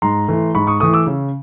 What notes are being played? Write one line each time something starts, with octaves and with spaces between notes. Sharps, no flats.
G#2 A#5 C6
E3 A3
G#2 B5 C#6
C#6 D#6
E3 A3 C#6 D#6
D6 E6
C#3